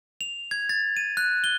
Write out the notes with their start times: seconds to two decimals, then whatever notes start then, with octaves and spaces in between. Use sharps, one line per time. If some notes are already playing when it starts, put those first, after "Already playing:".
0.21 F7
0.51 G#6
0.69 A6
0.97 D#7
1.17 F#6
1.44 G7